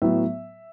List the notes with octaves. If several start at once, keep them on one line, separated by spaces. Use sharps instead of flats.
A2 F#3 B3 E5